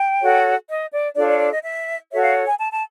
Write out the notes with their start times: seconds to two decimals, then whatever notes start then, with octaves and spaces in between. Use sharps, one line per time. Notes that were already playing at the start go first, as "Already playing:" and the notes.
Already playing: G5
0.21 F#4 A4 C#5
0.69 D#5
0.92 D5
1.16 D4 F4 A4 C#5 D5
1.28 D5
1.40 D5
1.51 D#5
1.64 E5
2.12 F#4 A4 C#5 E5
2.23 F5
2.47 G#5
2.60 A5
2.73 A5